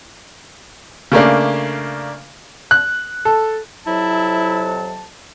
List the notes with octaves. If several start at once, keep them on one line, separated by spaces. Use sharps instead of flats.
C#3 A3 A#3 D4
F#6
A4
F2 C3 F#3 E4 A5